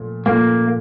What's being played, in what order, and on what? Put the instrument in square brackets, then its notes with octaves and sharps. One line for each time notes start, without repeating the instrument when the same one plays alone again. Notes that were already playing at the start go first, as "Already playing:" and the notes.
Already playing: [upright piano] A#2 F3 A3
[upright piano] A#2 F3 A3 [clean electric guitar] A#3